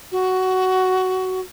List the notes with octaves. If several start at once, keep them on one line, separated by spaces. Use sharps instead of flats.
F#4